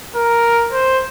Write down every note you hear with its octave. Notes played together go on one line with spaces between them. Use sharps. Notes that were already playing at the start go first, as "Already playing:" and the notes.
A#4
C5